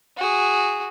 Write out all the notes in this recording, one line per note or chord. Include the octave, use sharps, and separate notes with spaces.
F#4 G#4